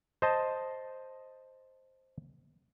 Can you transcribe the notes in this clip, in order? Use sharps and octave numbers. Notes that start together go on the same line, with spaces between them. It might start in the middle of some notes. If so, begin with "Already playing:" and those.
C5 D#5 A5